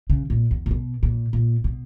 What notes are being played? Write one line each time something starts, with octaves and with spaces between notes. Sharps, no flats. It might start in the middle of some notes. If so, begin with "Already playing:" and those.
C#3
A#2
E2
A#2
B2
A#2
A#2
B2